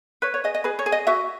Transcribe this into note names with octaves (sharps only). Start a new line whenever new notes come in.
B4 C#5
C#5
G#4 D#5
D#5
G#4 B4
C#5
G#4
D#5
F#4 E5